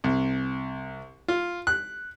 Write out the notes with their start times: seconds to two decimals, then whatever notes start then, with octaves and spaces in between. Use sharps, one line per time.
0.04 C2
1.28 F4
1.67 F#6